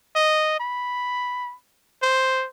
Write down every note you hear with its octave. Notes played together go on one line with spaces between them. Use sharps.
D#5
B5
C5